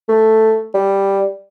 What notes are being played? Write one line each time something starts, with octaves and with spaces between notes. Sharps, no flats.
A3
G3